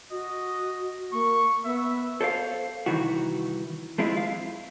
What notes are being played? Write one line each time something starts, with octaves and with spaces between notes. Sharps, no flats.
F#4 D#5
A#3 C#6
B3 E5
A4 C5 C#5 F5
C2 D#3 E3 F#4
F3 G#3 C4 E4 F4
F5